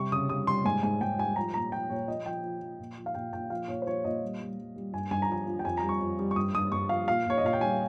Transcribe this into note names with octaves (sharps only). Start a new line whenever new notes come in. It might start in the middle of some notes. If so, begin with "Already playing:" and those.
Already playing: C3 G3 C#6
C#3 D#6
G3 D#6
G3 C6
G#2 G#5
G#2 G#5
G#2 G5
G3 G#5
F3 A#5
A#2 A#5
F3 G5
A#2 C#5
F3 D#5
F3 G5
F3
F3
A#2
F3
F5
A#2 G5
A#2 G5
F3 F5
A#2 C#5
C5
F3 C#5
A#2 D#5
G3
G3
G3
G3
G2 G#5
G2 G#5
A#5
F3 G#5
F3
G5
F2 G#5
A#5
G3
C#6
F2
G3
C#6
G2 D#6
G2 D#6
G2 C#6
F3 F5
A#2 F5
A#2 C#5
D#5
A#2 F5
G5
G3 G#5